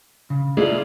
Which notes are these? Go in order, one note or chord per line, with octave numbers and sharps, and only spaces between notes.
C#3
G#3 E4 F4 D5